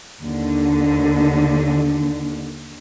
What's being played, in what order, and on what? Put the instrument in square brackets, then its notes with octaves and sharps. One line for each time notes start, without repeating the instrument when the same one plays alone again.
[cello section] D#2 D3